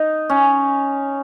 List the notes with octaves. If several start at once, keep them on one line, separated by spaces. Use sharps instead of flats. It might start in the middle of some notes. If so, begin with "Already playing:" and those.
Already playing: D#4
C#4